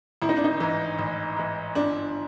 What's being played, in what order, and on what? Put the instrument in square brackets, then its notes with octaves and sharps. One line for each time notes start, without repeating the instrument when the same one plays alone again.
[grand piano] A1 [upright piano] E4
[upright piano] D#4
D4
D#4
[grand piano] G#2 E3
A1
G#2 E3
[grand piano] G1 [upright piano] D4